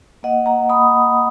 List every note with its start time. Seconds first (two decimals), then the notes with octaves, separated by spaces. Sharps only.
0.23 A#3 D#5 F#5
0.46 F#5 A#5
0.69 A#3 B5 D#6